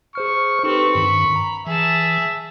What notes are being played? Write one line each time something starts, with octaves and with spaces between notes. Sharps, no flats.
G#4 C5 C#6 F6
C4 D#4 G4 A4 B4 C#6
G2 D#3 B5
A#5
E3 G#4 E5 A5